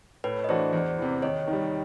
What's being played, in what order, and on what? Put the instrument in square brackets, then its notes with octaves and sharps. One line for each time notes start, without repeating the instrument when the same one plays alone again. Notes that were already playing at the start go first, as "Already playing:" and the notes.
[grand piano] A2 [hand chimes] B4 C#5
[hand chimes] D#5
[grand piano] E3 A3 D4 F#4 [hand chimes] C5 D5
[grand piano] E2
C3 E3
[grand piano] D#2 [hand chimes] C#5 D#5
[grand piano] D#3
G3